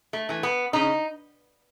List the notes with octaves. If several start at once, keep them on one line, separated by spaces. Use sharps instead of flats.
A3
E3 A3
B3
C#3 D#4